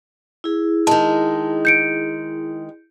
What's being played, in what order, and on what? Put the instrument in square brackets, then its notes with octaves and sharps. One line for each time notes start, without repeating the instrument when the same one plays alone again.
[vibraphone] E4 G#4
[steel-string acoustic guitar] D#3 G#3 [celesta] A5
[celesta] G6 C#7 D7